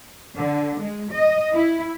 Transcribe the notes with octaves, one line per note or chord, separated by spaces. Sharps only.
D3
G#3
D#5
E4